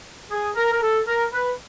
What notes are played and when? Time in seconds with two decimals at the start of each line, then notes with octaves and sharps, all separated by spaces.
0.31 G#4
0.56 A#4
0.72 A#4
0.82 A4
1.07 A#4
1.32 B4